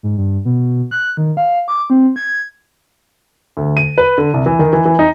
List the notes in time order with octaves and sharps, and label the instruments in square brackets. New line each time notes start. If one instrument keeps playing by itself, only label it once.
[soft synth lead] G#2
G2
B2
F#6
D#3
F5
D6
C4
G#6
[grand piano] D2
D#7
B4
D3
C2
E3
D#3
E3
E3
D#4